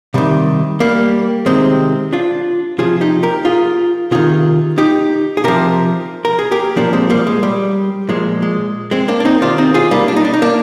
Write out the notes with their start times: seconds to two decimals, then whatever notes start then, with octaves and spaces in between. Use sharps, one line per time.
0.14 C3 D#3 G3
0.80 G3 A#3
1.46 C3 D#3 G#3 C4
2.13 D4 F4
2.78 C3 F3 F4 G#4
3.01 D#4 G4
3.23 G4 A#4
3.45 F4 G#4
4.11 C3 D#3 F4 G#4
4.78 D#4 G4
5.37 G#4
5.44 C3 F3 G4 A#4
6.25 A#4
6.39 G#4
6.51 G4 A#4
6.76 A#2 F3 A#3 D4
6.93 G#3 C4
7.10 G3 A#3
7.27 G#3
7.43 G3
8.09 A#2 F3 G#3
8.42 G#3
8.91 G#3 C4
9.08 A#3 D4
9.20 D4
9.25 C4 D#4
9.41 C3 D#3 D4 F4
9.58 C4 D#4
9.74 F4 G#4
9.91 G3 A#3
10.08 D4
10.16 D#4
10.25 D4
10.34 D#4
10.42 A#3 D4